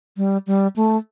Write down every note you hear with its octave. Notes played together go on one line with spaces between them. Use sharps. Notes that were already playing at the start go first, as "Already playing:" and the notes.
G3
G3
A3